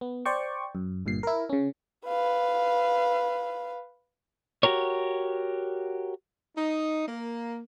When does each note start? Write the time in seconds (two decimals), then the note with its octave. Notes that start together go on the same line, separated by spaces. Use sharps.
0.01 B3
0.25 C5 D5 G5 C#6
0.75 F#2
1.06 G1 G2 A#2 C7
1.23 E4 A#4
1.49 C#3 C#4
2.07 B4 F5
4.63 F#4 G4 A#4 C#5
6.55 D#4
7.06 A#3